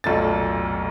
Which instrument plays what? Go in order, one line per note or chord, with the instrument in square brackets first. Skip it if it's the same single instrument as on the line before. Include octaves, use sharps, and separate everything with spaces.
[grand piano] F1 B1 A#2 A4 A6